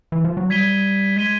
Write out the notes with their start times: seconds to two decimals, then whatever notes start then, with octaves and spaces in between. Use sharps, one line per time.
0.12 E3
0.24 F3
0.37 F#3
0.50 G3 G#6 B6 D#7 G7
1.16 G#3 G#6 B6 D#7 G7